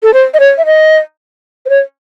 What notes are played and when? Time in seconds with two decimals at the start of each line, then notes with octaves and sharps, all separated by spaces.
0.03 A4
0.13 C5
0.34 D#5
0.40 C#5
0.58 E5
0.66 D#5
1.66 C5
1.69 C#5